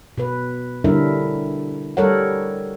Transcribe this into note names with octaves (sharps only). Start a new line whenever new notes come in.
B2 B4
D3 G3 D4 E4 A#4 E5
G3 A4 A#4 C#5 F#5